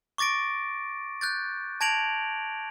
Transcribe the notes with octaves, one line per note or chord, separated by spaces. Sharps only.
C#6 D6 A6 A#6 D7
F#6 G6 A6
A5 G#6 A#6 D7 F7 F#7